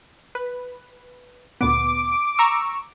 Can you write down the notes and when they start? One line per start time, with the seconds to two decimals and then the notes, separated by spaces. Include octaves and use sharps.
0.35 B4
1.61 D2 A#2 B3 D6
2.39 A#5 C#6 E6